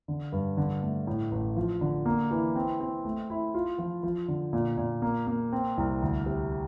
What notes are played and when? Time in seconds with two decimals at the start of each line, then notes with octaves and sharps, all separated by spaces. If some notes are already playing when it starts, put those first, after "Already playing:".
0.08 D3
0.32 G2
0.57 D3
0.83 A3
1.07 A2
1.31 A1
1.56 F3
1.81 D3
2.06 A#3
2.31 E3
2.55 C4
2.80 C4
3.05 A3
3.30 E4
3.54 F4
3.78 F3
4.03 F3
4.28 D3
4.53 A#2
4.77 A#2
5.02 A#3
5.27 A#3
5.52 C4
5.77 C2
6.02 D2
6.26 C3